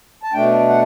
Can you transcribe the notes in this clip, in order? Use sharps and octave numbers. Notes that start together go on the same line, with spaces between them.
A5
B2 A3 D4 G5
F#5